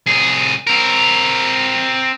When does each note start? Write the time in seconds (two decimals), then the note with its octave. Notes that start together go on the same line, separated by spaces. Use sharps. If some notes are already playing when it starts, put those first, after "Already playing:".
0.06 C2 G#4
0.67 C4 A#4